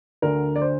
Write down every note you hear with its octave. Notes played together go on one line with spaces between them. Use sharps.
D2 D3 A#4
D5
C5